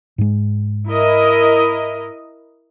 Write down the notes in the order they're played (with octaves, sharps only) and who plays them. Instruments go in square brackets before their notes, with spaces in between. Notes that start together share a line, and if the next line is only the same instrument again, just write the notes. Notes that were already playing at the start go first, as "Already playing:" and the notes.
[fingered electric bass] G#2 G#3
[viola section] E4 A#4 D#5